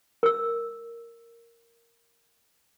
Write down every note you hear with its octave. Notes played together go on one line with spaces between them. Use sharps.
A#4 E6